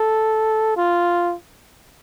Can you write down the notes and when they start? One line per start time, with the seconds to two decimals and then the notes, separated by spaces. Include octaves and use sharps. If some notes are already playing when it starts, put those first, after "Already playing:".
Already playing: A4
0.77 F4